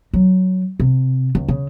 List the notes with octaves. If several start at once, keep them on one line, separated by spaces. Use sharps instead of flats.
F#3
C3
C#2
C#3